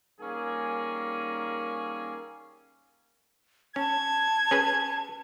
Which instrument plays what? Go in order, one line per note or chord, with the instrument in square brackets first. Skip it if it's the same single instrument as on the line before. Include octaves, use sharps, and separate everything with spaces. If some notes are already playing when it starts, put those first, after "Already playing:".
[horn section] D#3 G3 A#3 C#4 G#4
[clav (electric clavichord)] C#4 [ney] A5 [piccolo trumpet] G#6
[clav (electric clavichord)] C#4 G#4 B4